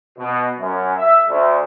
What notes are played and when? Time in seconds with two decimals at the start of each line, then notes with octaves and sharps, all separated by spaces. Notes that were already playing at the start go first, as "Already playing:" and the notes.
0.18 B2
0.59 F#2
0.97 E5
1.28 D2